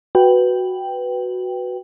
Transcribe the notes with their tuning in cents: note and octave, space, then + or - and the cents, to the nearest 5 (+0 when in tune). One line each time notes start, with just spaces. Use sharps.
F#4 +0 B4 +0 G5 +0